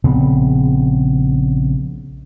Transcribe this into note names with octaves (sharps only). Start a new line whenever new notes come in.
A#1 C#3 B3 C4